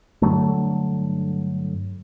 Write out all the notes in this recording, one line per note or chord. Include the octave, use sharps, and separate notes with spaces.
G2 D3 F#3 A3